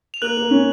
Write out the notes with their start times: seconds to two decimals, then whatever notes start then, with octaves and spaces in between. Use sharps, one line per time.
0.14 F7
0.22 A#3 F#6 F#7
0.37 A#3
0.51 C#4